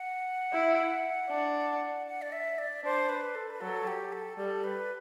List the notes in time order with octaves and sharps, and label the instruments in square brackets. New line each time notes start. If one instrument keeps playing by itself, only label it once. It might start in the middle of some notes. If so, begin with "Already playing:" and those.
Already playing: [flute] F#5
[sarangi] E4
D4
[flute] F#5
D5
E5
D5
[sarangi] D4 [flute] C5
[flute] B4
A4
B4
[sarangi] F#3 [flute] A4
[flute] G4
A4
[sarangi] G3 [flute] A4
[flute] B4